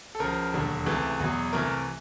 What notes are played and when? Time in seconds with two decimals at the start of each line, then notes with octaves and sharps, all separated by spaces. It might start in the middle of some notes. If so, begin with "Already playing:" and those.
0.15 A4
0.20 C#2 C#3 F3 A#4
0.54 E1 D#2 D3 F#3
0.86 C#2 C3 E3 A3
1.20 E2 B2 F#3
1.53 C2 C3 E3 A3 A#4